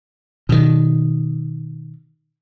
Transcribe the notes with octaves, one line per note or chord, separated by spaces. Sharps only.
B2 D#3